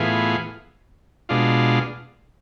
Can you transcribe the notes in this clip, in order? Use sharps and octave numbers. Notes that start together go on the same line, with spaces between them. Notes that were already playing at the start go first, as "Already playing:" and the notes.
Already playing: A2 E3 B3 F4 G#4
B2 G#3 D4 F4